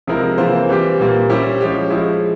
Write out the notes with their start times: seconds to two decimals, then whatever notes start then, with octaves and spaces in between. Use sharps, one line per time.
0.07 C3 F3 G#3 E4 A#4
0.38 C3 E3 A#3 F4 C5
0.69 E3 G3 C4 G4 C5
1.00 A#2 G3 A#3
1.29 G3 C#4 E4 G4 C5
1.61 F3 G#3 C#4 G4
1.90 F3 G#3 E4